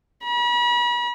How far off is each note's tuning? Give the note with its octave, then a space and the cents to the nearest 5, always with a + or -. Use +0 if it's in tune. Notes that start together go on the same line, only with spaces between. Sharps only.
B5 -40